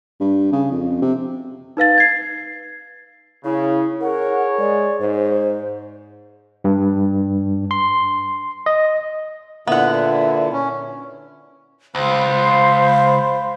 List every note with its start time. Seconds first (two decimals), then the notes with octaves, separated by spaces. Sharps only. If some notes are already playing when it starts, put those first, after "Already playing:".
0.20 G2
0.52 C#3
0.71 F2
1.02 C3
1.77 D#4 B4 F5 A6
1.98 G#6 C7
3.44 C#3 E4
4.01 G#4 A#4 C#5 F#5
4.59 G#3 D5
5.00 G#2 C5
6.64 G2
7.71 C6
8.66 D#5
9.68 A#2 D3 B3 E4 F#5
10.53 C#4
11.95 C#2 C5 F5 B5 C6